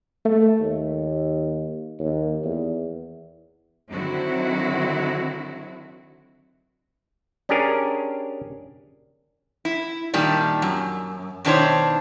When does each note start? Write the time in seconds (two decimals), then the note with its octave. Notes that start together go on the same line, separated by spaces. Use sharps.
0.25 A3
0.60 D#2
1.99 D#2
2.44 E2
3.91 D3 D#3 F#3 C4 E4 F#4
7.49 C#4 D4 G4 G#4 A#4
9.65 E4
10.14 A#2 D#3 G3 D4
10.62 F#2
11.45 B2 D#3 D4 E4 C5 C#5